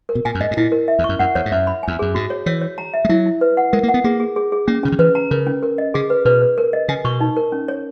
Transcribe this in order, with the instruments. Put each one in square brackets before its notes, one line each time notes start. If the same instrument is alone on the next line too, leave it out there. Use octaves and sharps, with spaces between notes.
[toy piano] A#4
[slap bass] B2
[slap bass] A#2 [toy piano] G#5
[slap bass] F#2
[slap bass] G#2 [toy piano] D#5
[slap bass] G#2
[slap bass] A#2 [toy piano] E4
[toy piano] A#4
E5
[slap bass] E2
[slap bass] F#2 [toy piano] C#6
[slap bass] F#2 [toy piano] F#5
[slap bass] E2 [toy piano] C#5
[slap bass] G#2
[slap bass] F#2 [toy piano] E5
[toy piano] B5
[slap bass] E2 [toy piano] G#5
[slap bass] F#2 [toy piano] G#4
[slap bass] G#2 [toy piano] F#4
[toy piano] C#5
[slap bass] E3 [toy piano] C#5
[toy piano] C#5
A#5
E5
[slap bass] G#3
[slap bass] F#3 [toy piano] E4
[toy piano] E4
B4
F#5
[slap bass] G#3 [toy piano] A#4
[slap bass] A#3
[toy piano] F#5
[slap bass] B3
[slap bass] A#3 [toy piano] G#4
[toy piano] G#4
G#4
G#4
[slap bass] A#3 [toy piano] C#4
[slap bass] C#3 [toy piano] C#4
[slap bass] D#3
[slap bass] E3 [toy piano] B4
[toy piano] A#5
[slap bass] C#3 [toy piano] A#4
[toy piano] C#4
A#4
D#5
[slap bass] C#3 [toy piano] G#4
[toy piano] B4
[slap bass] B2 [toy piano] B4
[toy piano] B4
A#4
D#5
[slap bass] C#3 [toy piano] G#5
[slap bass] B2 [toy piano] C#6
[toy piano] D#4
A#4
C#4
C#5